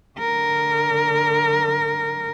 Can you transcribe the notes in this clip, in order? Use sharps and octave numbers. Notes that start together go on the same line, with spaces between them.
D3 A#4